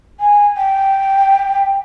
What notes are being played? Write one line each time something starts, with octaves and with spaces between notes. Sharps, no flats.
G#5
G5